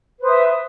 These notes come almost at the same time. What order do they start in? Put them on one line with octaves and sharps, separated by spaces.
B4 C5 D#6 E5